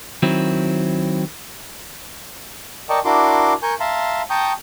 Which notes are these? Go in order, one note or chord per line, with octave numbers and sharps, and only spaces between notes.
D#3 F#3 C4 E4
A#4 D5 D#5 G5 A5 C#6
D4 E4 F#4 A#4 C6 D6
A#4 G#5 C#6 G6
E5 F5 A5 A#5 C6
G5 A5 A#5 C#6 D#6 G6